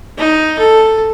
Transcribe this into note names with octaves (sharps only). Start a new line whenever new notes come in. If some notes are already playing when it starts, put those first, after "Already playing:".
D#4
A4